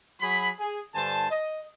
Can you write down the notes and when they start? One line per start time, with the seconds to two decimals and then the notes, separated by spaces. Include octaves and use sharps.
0.21 F#3 F#4 G#4 B5
0.60 G#4
0.94 G2 D3 C5 G#5 A5
1.30 D#5